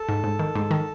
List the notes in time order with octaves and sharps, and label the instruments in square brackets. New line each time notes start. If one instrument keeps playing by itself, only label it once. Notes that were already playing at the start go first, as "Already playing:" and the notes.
Already playing: [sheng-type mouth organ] A4
[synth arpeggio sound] G#2
G#2
D#3
G#2
D#3